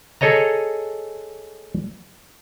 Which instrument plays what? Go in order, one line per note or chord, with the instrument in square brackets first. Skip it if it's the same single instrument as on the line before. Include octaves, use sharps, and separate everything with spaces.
[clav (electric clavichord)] G#4 A4 C#5 D#5 A#5